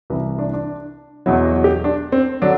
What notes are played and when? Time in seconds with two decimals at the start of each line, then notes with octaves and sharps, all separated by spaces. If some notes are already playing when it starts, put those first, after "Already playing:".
0.10 C2 C3 E3 B4
0.39 D4
0.53 D4
1.26 E2 B2 F#3 E4
1.45 F#4
1.64 G4
1.84 D4
2.12 C4
2.42 D3 F#3 D4